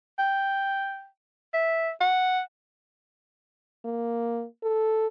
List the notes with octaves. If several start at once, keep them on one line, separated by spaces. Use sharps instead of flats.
G5
E5
F#5
A#3
A4